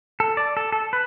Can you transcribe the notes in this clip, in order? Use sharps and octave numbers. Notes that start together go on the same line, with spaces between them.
A4
D5
A4
A4
B4